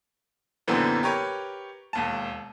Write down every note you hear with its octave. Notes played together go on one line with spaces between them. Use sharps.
F#2 A#2 D3 E3 B3 C4
G4 A#4 B4 C#5
E1 D#2 A5